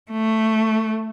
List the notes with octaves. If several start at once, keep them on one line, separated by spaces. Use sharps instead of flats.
A3